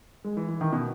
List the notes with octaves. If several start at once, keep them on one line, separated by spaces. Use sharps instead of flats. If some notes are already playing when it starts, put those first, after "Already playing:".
G#3
E3
E3
D#3
B2